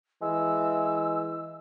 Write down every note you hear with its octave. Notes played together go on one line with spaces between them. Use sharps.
E3 G#3 E6